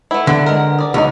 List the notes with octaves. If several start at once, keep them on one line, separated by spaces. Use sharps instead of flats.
A3 E4 B4 F#5
D3
G#3 C4 A#4
G#4 D5
C#2 D#4 F4 F#4